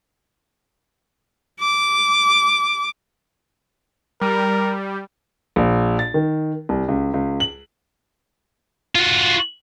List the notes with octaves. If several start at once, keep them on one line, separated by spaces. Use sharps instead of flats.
D6
G3 A#4
A#1
A6
D#3
C2
C#2
C#2
F#7
F4 F#4